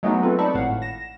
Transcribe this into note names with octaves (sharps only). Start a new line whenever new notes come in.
F#3 G#3 A3 B3 D#4 F#4
C4 F4 A4 B4
D#4 D5 A5 B5 C#6
G#1 A2 F5 F#5
A#6 E7